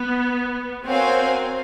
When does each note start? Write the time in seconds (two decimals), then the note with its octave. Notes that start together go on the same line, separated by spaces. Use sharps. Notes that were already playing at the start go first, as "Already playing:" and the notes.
Already playing: B3
0.85 C4 F#4 A#4 C#5 F5 G#5